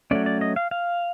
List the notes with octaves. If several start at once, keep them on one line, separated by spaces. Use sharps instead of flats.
F#3 A3 C#4 D5
D5
D#5
F5
F5